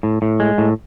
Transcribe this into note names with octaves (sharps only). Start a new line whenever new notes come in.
A2
A2
G#3
A2